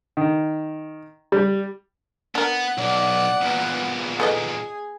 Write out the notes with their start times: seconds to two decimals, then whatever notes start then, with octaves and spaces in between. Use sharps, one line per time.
0.17 D#3
1.32 G3
2.35 B3 D4 A#4 F#5
2.78 B1 D5
3.41 E2 A#2 B3
4.20 G#4 A4 B4 D#5